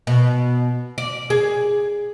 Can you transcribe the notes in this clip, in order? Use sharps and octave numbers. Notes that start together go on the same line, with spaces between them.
B2
D5
G#4